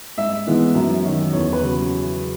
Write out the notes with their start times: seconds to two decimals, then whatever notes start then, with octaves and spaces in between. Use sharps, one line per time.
0.18 G#2 E5
0.46 E3 G#3 B3 D#4
0.75 F#2
1.04 D#3 F#3 C#4
1.33 E2 C#5
1.53 B4
1.62 C#3 F#3